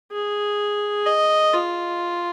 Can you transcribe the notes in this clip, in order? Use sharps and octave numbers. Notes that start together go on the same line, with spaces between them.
G#4
D#5
F4